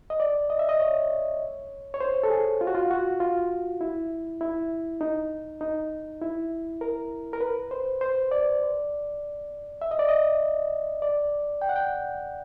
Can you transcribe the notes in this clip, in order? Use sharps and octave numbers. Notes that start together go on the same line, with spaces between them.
D#5
D5
D#5
E5
D#5
C#5
C#5
C5
A4
G#4
F4
F#4
F4
F#4
F4
E4
E4
D#4
D#4
E4
A#4
A#4
B4
C5
C5
D5
E5
D#5
D5
D#5
D5
G5
F#5
G5